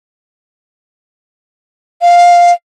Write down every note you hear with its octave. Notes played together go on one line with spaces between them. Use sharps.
F5